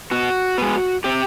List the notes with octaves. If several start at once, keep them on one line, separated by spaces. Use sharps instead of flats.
B2 F#4
G#3 B3
C3 G4